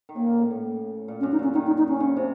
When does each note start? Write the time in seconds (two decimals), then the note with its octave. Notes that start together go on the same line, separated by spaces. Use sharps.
0.09 D#3
0.16 C#3 A#3
0.27 A#2
0.39 A2
0.51 A2
1.08 A#2
1.20 C#4
1.23 F#2
1.32 D#4
1.39 A#2 C#4
1.54 D#3 D#4
1.67 D#4
1.78 D#4
1.89 C#4
2.00 C#3
2.17 C3